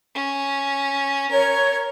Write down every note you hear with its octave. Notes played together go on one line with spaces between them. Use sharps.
C#4
A#4 C#5